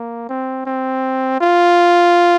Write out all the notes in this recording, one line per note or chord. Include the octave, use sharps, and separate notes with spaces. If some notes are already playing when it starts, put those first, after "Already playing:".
Already playing: A#3
C4
C4
F4